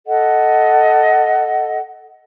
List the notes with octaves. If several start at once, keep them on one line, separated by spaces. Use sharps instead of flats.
A4 D#5 F#5